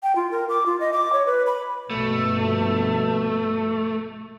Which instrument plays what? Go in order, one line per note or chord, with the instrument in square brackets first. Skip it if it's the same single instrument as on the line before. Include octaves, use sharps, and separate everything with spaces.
[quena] G5
F4
A#4
D6
F4
D#5
D6
C#5
B4
B5
[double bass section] A#1 G2 B2 [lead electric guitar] A3